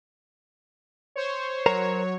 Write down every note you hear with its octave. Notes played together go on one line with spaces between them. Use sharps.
C5 C#5
F#3 A#4 C5 C#5 A#5